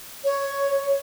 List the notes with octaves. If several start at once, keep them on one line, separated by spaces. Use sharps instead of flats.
C#5